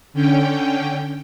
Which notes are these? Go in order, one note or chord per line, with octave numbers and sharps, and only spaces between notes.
D3 C#4 G5